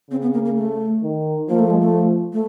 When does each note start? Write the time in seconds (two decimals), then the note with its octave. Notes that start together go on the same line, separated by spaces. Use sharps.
0.10 C#3 C4
0.22 B3
0.34 A#3
0.45 A#3
0.57 A3
1.03 D#3
1.49 F3 A#3
1.59 A3
1.70 G#3
1.80 A3
2.33 A3